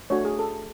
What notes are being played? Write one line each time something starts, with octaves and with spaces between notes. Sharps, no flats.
A3 D4 F#4 C#5
G#4
A4